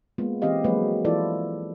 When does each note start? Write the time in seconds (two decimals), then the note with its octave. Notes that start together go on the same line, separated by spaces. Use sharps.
0.18 G#3 A#3 B3 F4
0.42 E3 C4 G4 D#5 F5
0.64 F3 F#3 G#3 A#3 F#4 B4
1.05 E3 F3 E4 F4 A4 D5